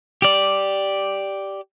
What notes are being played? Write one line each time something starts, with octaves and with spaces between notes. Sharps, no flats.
G4 D5